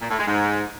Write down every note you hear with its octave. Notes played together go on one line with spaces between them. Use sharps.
A#2
A2
G#3
G#2